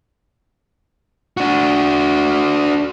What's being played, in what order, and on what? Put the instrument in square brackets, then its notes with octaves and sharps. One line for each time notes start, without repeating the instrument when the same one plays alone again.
[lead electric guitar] D4 F#4